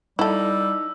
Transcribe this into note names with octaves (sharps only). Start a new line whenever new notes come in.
G3 D#4 E4 A4 E6